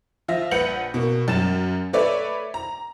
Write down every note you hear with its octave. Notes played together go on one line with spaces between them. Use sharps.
F3 F4 E5 A#6
A#1 B4 F#5 G6 C#7 F#7
B2 A#3
F#2 A6 E7
A3 B4 C#5 D5 E5
A#5